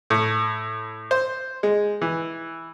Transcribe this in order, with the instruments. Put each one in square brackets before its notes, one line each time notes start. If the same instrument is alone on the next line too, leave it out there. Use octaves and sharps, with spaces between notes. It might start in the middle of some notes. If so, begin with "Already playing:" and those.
[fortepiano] A2
C5
G#3
E3